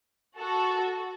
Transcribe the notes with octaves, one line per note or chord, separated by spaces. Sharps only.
F#4 A4